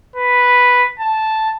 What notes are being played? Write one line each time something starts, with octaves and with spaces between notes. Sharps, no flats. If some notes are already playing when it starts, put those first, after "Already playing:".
B4
A5